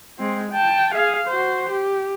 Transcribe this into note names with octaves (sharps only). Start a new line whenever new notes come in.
G#3 C4
G5 A5
G#4 F5
F#4 C5
G4